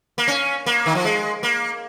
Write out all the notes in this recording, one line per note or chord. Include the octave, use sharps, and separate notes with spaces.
A#3
C#4
A#3
D#3
F3
G#3
A#3